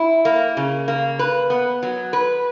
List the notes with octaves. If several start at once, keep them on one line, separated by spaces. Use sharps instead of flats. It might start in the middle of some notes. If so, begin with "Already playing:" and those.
Already playing: E4
A#3
C#3
A#3
B4
B3
F#3
B4